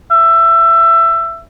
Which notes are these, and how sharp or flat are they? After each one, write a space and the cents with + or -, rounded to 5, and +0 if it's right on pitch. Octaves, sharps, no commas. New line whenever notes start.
E5 +20